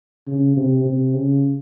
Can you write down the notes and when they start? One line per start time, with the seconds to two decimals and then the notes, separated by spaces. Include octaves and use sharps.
0.27 C#3
0.57 C3
0.85 C3
1.14 C#3